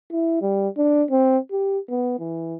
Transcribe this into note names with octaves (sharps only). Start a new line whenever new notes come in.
E4
G3
D4
C4
G4
B3
E3